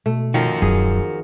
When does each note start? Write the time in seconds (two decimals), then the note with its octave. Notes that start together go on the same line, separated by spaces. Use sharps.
0.06 B2 A3
0.34 D#3 F3 F#4 A#4
0.62 D1 F#2 G#4